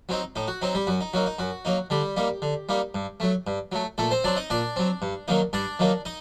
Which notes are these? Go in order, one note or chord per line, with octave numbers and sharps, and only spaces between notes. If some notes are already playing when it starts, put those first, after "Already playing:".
F#3 C4 D#4
A2 D#4
F#4
F#3 C4 D#4
G3 G4
F#2 F#4
D#4
F#3 A#3 D#4 F#4
D#4
F#2 F#4
F#3 A#3 D#4
D3 G3 G4
G3 A#3 D#4
D3
G3 A#3 D#4
G2
F#3 A3
G2
F#3 A3
A#2 A3 A4
C4 C5
F#3 C4 D4 D5
D#4 D#5
A#2 D4 D5
F#3 C4
G2
D#3 F#3 A#3 D#4
G2 D4 D5
D#3 F#3 A#3 D#4
D#4 D#5